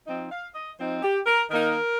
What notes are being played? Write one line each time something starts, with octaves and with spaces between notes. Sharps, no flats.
F3 C4 D#4
F5
D#5
F3 C4 D#4 C5
G4
A#4
D#3 A#3 D#4 A#4